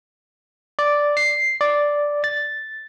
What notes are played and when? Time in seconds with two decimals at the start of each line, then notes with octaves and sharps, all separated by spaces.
0.79 D5
1.17 C7
1.61 D5
2.24 A6